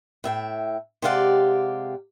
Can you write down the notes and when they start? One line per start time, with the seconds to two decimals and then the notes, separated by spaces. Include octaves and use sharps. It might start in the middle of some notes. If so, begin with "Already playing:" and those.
0.24 A2 E5 G5
1.02 C3 G#3 G4 D5 F5 F#5